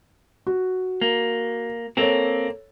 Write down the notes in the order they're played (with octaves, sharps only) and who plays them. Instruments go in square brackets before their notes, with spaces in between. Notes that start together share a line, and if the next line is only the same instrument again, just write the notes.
[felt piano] F#4
[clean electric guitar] A#3
[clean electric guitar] A#3 C4 [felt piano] A4 C#5